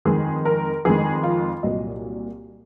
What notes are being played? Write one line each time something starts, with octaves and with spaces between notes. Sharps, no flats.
F2 D#3 G#3 G#4
A#4
F2 D#3 G#3 G#4
F4
C2 A#2 F#3 D#5